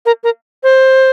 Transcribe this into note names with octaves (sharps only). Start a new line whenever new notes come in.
A#4
A#4
C5